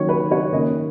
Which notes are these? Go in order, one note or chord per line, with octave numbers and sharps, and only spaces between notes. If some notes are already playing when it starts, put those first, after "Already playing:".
Already playing: D#3 F#3 A#3 C#4 C#5
B4
C#5
D#3 A#3 C#4 D#5